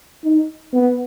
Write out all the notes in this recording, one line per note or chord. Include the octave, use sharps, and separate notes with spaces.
D#4
B3